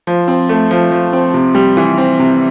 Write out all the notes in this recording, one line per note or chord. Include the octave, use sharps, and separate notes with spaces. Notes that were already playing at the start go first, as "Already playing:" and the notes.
F3
C4
A3
F3
F3
C4
C3
G3
E3
C4
C3